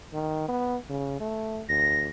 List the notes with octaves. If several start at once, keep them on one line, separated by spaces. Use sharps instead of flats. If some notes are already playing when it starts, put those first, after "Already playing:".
D#3
B3
C#3
A3
D2 A#6